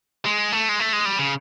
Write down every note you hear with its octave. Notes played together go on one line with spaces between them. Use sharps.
G#3
A3
G#3
A3
G#3
G3
C#3